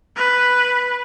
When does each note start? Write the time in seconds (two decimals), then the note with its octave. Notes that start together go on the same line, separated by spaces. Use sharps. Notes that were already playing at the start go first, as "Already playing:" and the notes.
0.17 B4